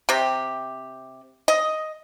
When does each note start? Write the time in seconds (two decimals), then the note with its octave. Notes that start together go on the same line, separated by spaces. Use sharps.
0.09 C3 G4
1.48 D#5